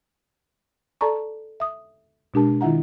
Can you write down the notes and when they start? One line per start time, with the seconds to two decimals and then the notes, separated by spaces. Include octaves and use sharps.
1.01 A4 D5 A5 A#5 C#6
1.60 E5 D#6
2.34 B2 G#3 D4 G4 A#4 A5
2.61 D#3 E4 F4 E5 F#5 A#5